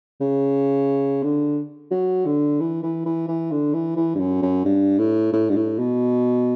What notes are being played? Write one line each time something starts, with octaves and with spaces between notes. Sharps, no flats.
C#3
D3
F#3
D3
E3
E3
E3
E3
D3
E3
E3
G2
F#2
F#2
G2
A2
A2
G2
A2
B2